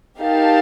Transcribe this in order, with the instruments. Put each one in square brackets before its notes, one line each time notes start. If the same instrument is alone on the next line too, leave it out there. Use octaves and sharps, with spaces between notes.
[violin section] D#4 G4 A#4 F5 A5